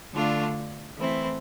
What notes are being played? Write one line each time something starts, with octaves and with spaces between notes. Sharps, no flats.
D3 A3 D4 F4
E3 A3 C4 E4